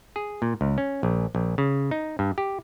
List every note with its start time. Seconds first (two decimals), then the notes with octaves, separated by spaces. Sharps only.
0.16 G#4
0.42 A#2
0.61 C#2
0.78 C#4
1.03 A#1
1.35 A#1
1.58 C#3
1.91 D#4
2.19 G2
2.38 G4